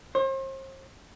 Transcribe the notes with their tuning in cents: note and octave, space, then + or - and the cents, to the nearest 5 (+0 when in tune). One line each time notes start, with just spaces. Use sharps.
C5 +40